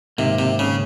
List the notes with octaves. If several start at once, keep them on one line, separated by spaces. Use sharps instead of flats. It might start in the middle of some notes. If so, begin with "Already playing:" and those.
G#2 C3 D#3 A#3
C3
C#3